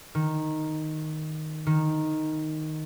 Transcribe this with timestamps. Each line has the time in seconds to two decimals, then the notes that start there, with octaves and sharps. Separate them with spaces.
0.15 D#3
1.67 D#3